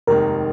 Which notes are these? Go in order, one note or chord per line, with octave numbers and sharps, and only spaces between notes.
F1 D#2 D#3 G#3 A#4